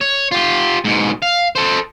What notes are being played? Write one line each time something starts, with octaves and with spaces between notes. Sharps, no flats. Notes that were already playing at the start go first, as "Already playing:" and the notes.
C#5
F4 G4
G#2 B2
F5
A4 C5